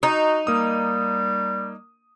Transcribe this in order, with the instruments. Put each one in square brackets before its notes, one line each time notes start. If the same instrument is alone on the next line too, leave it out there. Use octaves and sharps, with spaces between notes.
[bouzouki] D#4 [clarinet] F#4
[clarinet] G3 [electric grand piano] A#3 D#6